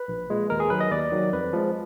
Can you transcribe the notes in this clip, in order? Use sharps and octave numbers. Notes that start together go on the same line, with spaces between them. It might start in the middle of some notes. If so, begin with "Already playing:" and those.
Already playing: B4
A#1
A#2 G#3
D#2 A#4
G#4
D#3 F#3 B4
D#5
D#2 D5
D#3 F#3
F2 B4
F3 G#3